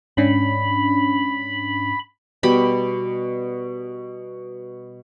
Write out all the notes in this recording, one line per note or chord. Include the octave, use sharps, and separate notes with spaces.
G#2 C#4 D4 B5
B2 G3 B5